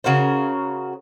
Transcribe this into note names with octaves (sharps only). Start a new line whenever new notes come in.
C#3 F#4 A#4 C5